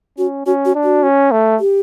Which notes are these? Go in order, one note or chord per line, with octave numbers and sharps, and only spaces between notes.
C#4 F#4
C#4 F#4
F#4
D4
F#4
C#4
A3
G4